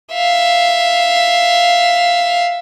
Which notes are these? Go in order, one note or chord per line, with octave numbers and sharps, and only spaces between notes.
E5 F5